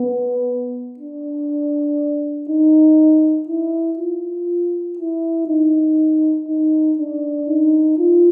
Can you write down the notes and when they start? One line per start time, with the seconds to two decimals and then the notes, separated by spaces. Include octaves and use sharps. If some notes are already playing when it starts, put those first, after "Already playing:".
Already playing: B3
0.99 D4
2.49 D#4
3.49 E4
3.99 F4
4.98 E4
5.48 D#4
6.48 D#4
6.98 D4
7.49 D#4
7.98 F4